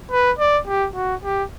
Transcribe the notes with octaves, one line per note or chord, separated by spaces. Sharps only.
B4
D5
G4
F#4
G4